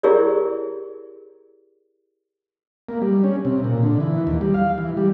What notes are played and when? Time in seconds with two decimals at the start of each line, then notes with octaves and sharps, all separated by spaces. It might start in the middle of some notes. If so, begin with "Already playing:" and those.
0.03 E4 G4 G#4 A#4 C#5 D5
2.89 A#3
3.02 G3
3.24 C#4
3.45 C3
3.64 A#2
3.83 D3
4.00 E3
4.27 D#2
4.41 G3
4.54 F5
4.78 E3
4.97 G3